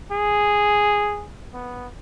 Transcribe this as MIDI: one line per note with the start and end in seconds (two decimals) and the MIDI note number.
0.12 1.26 68
1.53 1.87 59